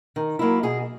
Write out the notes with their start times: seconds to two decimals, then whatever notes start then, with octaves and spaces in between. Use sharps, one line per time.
0.16 D#3
0.39 F#3 A#3 E4
0.63 B2 G#4